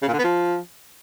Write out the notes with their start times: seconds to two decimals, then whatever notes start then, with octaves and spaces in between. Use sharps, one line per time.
0.02 C#3
0.08 A#2
0.13 D3
0.19 B3
0.24 F3